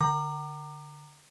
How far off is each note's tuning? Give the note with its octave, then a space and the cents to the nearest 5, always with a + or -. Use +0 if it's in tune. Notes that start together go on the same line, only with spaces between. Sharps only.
D3 +0 A#5 -15 D6 +30